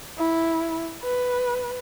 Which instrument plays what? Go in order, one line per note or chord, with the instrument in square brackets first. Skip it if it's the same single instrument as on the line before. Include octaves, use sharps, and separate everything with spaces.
[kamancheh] E4
B4